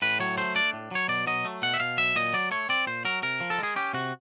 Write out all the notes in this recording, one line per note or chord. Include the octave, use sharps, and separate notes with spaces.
A2 B4
F#3 C#5
A3 C5
D4 D5
A2
F#3 C#5
B2 D5
F#3 D#5
A3
B2 F#5
E5
B2 F5
F#3 E5
A#2 D#5
F#3 D5
A3 C#5
C4 D5
A#2 C5
F#3 A#4
C3 A#4
F3
A4
G#3
G#4
C#4 G4
C3 F#4